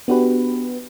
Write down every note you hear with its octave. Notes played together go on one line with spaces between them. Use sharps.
B3 D4 F#4 G4 B4